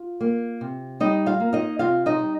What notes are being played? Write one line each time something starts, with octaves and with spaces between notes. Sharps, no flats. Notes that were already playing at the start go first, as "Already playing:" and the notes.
Already playing: F4
A#3
C3
G3 D#4 D#5
F4 F5
A#3
D#4 D#5
C3 F4 F5
D#4 D#5
G3